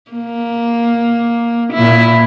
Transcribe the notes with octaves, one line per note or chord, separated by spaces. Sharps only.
A#3
A#2 E4